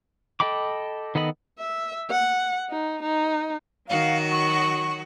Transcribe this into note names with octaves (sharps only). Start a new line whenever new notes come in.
A4 D#5 G5 B5 D6
D#3 B3 A4 D#5 B5
E5
F#5
D#4
D#4
D#3 F#3 F#4 F5
C#6